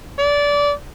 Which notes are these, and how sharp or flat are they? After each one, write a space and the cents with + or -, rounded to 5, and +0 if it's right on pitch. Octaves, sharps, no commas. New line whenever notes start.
D5 -20